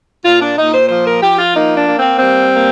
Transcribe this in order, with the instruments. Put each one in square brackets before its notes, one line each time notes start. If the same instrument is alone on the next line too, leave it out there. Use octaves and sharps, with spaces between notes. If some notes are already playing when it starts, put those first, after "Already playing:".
[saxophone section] A#2 F4
D4
A#2 D#4
C5
F3 C5
A#4
F3 G4
F4
A#3 D#4
D4
A#3
C4
G3 C4
A#3